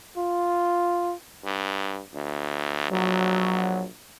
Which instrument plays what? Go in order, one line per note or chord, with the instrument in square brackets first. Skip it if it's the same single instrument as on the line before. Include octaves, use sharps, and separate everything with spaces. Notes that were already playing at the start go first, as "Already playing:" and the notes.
[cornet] F4
[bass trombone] G2
D2
[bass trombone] A#1 [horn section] F#3